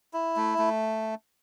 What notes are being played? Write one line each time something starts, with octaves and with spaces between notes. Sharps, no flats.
E4
A3
A3